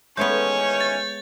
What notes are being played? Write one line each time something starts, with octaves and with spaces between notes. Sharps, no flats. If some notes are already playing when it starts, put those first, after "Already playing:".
D#3 E3 G#3 A3 B3 C#4 C#5 G6
A6